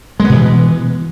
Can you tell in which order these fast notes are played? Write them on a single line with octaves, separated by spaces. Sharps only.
G#3 B3 B2 E3